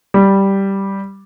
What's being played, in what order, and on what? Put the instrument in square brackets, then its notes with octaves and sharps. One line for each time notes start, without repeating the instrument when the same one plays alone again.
[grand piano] G3